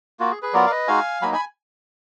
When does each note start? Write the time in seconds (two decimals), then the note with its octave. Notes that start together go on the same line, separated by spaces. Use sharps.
0.20 A#3 F4 F#4
0.31 G#4
0.42 G#4 B4
0.54 F#3 B3 F4 A#4 D5
0.66 F5
0.70 B4 D#5
0.88 G#3 D#4 F#4 F5 G#5
1.22 F#3 A#3 D#4 G#5 B5
1.33 G#5 B5